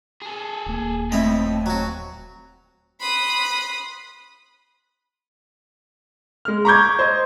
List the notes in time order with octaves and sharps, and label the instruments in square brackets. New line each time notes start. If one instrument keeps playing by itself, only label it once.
[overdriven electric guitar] G#4 A4
[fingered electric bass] D#1 A#3
[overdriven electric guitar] F2 [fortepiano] A2 C4 [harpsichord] E4 D#5
[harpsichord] F#3 F#4
[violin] B5 F#6 [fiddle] C6 D#6
[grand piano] G#3 F6
A#5 B5 C#6 D6 G6 G#6
C5 D#5